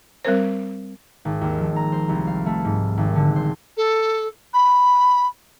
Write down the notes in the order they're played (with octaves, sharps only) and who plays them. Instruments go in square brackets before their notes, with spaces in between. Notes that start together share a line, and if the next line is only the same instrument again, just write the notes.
[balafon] G3 C4 A#4 C5
[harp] G#1
D#2
F3
A#5
C5
C2
F5
A3
G#2
G#1
D3
C5
[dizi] A4
B5